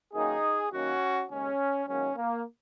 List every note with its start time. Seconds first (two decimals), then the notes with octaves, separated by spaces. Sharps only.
0.13 F#2 D#3 A#3 D#4 G#4
0.71 F#2 D#3 A#3 C#4 F#4
1.29 D#2 C#3 G#3 C#4
1.86 G#2 D#3 F#3 A#3 C#4
2.15 A#3